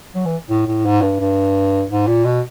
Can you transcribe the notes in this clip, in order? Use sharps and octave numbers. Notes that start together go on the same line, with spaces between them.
F#3
E3
A2
A2
G#2
G2
G2
G#2
A#2
B2